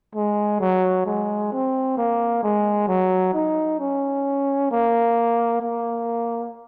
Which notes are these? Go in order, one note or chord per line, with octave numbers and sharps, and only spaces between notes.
G#3
F#3
G#3
C4
A#3
G#3
F#3
D#4
C#4
A#3
A#3